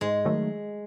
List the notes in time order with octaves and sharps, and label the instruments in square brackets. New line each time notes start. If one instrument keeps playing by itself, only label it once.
[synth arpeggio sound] G#2 [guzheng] G#3
[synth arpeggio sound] D#3 F#3 A3